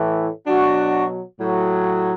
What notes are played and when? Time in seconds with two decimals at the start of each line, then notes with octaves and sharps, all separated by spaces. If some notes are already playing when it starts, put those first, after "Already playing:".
Already playing: A2 E3
0.47 B2 F#3 D4 F#4
1.39 A2 F#3